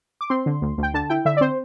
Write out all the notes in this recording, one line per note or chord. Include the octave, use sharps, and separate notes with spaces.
D6
C4 C6
D3
D2
D2
G5
D3 A5
E4 G5
D3 E5
D5
C4 C5